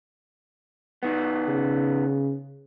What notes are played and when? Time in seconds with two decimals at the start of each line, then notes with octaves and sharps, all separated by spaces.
1.03 D#3 B3
1.48 C#3